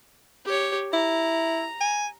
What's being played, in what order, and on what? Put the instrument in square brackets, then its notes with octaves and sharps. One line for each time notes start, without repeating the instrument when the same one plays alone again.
[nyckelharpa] G4 C#5
[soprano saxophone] E4 [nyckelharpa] A#5
[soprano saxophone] G#5